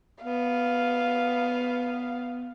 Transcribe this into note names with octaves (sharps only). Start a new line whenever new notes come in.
B3 F5